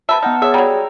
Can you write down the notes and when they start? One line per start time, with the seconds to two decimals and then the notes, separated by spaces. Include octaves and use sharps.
0.09 C3 B4 E5 A5
0.22 B3 D#4 F#5 F6
0.42 G#4 C#5 E5
0.54 F#3 G3 G5 A#5